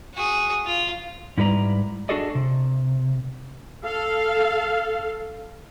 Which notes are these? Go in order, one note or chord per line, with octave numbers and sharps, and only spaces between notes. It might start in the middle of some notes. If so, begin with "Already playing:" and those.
F#4 G#4
F4
G#2 G3 E4 B4 D5 A#5
D4 F#4 G#4 A4 D5 D#5
C3
A4 F5